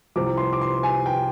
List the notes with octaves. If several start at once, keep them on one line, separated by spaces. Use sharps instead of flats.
C2 C3 F3 D6
C6
D6
C6
G#5
G5